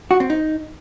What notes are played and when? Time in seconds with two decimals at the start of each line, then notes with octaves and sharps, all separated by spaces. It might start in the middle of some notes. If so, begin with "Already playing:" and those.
0.11 F#4
0.20 C4
0.30 D#4